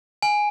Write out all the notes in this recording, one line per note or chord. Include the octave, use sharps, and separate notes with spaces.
G#5